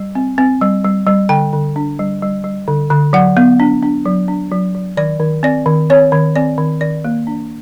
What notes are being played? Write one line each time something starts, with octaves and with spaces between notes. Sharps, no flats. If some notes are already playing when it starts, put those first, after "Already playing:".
Already playing: G3
C4
C4
G3
G3
G3
D3 G5
D3
D4
G3
G3
G3
D3
D3
F#3 F#5
B3
D4
D4
F#3
D4
F#3
F#3
D#3 D5
D#3
C4 D5
D#3
C4 C#5
D#3
C4 D5
D#3
D#3 D5
A#3
D4